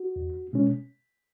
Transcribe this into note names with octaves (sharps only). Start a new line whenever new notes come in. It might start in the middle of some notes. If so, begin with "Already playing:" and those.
Already playing: F#4
E2
B2 G#3 C#4